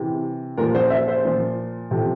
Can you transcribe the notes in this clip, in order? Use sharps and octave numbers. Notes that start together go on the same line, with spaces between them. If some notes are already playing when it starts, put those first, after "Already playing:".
Already playing: C3 E3
A#2 F3 A#4
C5
E5
C5
A#2 F3
C3 F3 A4